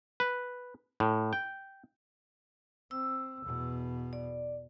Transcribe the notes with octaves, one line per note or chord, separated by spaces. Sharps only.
B4
A2
G5
C4 E6
E2 B2
D5